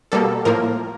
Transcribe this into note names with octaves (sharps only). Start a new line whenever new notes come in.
B2 G3 A#3 A4
A2 F3 A#3 A#4